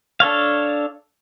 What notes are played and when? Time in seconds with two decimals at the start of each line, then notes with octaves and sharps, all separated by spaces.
0.20 D4 A4 C#5 F5